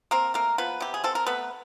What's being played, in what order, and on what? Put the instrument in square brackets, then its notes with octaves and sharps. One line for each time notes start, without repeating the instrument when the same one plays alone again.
[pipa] A#3 C4 A#4
A3 A#3 A#4
F3 B3 B4
C3 G4
G#4
C4 A4
A#4
A3 B3 B4